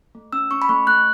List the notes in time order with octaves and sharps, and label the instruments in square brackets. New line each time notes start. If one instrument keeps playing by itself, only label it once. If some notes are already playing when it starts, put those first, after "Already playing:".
[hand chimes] A3
C#4 E6
C#4 C#6
B5
A3 C#6
A3 F#6